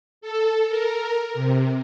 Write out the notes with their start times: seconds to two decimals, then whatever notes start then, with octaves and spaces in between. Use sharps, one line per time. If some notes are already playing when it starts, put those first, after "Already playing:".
0.21 A4
0.69 A#4
1.34 C3